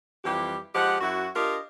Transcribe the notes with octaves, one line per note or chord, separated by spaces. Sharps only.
F2 E3 G3 G4
F3 G#3 G4 F#5
F#2 E4 F#4
D4 F4 G4 A#4 D#5